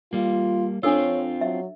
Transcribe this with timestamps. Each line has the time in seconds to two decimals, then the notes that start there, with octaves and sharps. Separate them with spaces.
0.13 G3 A#3 F4
0.83 C4 D4 F4 A4 C#5 E6
1.41 F#3 E5